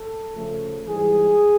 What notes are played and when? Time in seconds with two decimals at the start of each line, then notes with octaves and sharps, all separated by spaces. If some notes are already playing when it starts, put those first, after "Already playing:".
Already playing: A4
0.35 C#3 F3 A3
0.86 G#2 E3 G3 G#4